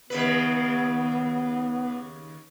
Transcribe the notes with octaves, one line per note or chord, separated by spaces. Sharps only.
D#2 C#3 B3 B4